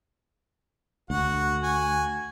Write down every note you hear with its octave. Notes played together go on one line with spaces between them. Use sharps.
D2 F#4 F#5
F#4 G#5